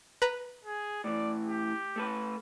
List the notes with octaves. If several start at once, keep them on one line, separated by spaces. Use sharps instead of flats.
B4 A#5
G#4
A2 E3 D5
G4
A3 A4 B4